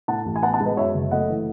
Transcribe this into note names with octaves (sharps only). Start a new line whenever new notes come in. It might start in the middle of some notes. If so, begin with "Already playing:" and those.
A2 F#5 A5
A1
G#5
B3 F#5 A5
F#5 A5
G#3
B4 D#5
F#2 C#5 E5
F#1
A3 D#5 F#5
E3